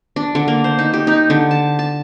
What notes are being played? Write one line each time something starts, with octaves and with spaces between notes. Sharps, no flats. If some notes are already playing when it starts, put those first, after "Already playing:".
D4
D3
A#3
C5
D#4
G4
D#4
D3
A5
A5